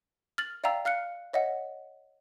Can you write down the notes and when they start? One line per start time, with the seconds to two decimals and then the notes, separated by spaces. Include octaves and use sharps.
0.38 F6 A6 F#7
0.64 D5 E5 F5 G5 A#5 E6
0.85 F5 F6 F#6 C#7
1.33 C#5 D#5 E5 F#5